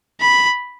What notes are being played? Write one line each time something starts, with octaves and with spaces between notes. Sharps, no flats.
B5